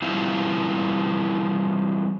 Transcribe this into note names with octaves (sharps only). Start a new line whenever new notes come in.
E3 G3 C4 E4 F4